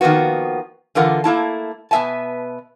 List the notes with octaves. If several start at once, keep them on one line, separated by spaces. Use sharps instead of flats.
D#3 F3 A#3 B3 F#4
D3 E3 F4 A#4 F#5
A3 A#3 E4 A5
B2 B3 A4 E5 G#5 A5